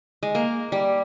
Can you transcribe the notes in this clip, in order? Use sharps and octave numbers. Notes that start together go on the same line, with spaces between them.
G#3
A#3
G3